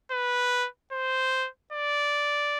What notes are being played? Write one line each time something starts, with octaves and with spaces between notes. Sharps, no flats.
B4
C5
D5